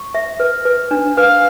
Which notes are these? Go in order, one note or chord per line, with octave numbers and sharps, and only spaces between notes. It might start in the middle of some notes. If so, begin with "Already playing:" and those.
Already playing: C#6
E5
B4
B4
D4
B4 F5